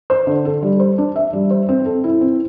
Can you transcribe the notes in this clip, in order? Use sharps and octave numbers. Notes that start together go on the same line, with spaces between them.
C5
D3
A4
G3
C5
D4
E5
G3
C5
C4
A4
E4
C4